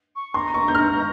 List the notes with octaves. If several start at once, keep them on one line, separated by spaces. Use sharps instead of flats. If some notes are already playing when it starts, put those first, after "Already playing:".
C#6
A#5 C6
C#6
G6
F6